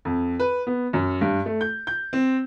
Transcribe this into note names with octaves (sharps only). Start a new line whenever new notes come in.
F2
B4
B3
F#2
G2
A3
G6
G6
C4